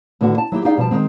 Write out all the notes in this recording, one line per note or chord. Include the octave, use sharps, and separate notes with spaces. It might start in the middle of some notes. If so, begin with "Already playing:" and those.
A2 D3 D#3 B3 D4 F#4
A5
F#3 E4 F#4 G4
D#4 G4 G#4 D5 F5 G5
B2 F3 G3 A5
D#3 F#3 G#3 C4